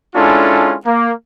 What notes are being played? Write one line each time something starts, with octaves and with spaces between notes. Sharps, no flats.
G#3 C#4 D4 E4 F4 A4
A#3